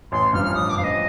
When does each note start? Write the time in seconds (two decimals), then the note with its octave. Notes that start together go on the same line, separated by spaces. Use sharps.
0.12 A1 C6
0.33 G2 F3 F6
0.44 F6
0.54 A1 D#6
0.70 D6
0.76 G2 F3 F5
0.84 D#5